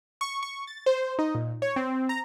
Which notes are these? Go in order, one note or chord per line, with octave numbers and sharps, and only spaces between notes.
C#6
C#6
A6
C5
D#4
A#2
C#5
C4
A#5